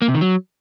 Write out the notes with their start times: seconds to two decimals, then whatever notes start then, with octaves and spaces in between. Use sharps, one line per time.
0.02 A#3
0.08 C3
0.15 D#3
0.21 F#3